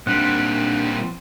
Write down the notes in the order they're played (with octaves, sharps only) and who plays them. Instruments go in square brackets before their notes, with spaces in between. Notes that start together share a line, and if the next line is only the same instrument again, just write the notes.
[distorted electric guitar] A#2 G3 [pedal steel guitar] C4 F#5 [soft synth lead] D4